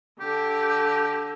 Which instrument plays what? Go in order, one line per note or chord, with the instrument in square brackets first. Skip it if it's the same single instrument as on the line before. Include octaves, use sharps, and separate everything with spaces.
[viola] D3 [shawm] G4